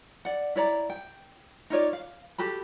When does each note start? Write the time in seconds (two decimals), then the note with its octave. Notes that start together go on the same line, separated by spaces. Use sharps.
0.25 D5 F#5
0.56 E4 C#5 D5 A#5
0.90 G5
1.70 D#4 F4 C#5 D5
1.93 F5
2.38 F#4 G4 A4 B5